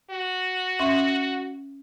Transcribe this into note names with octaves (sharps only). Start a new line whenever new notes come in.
F#4
C#4 E5 C6